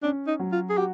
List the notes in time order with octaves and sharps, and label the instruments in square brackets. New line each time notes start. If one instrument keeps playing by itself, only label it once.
[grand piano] C#4 [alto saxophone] D4
[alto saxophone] D#4
[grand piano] F#3
[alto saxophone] F4
G#4
[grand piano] F#4 [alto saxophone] G4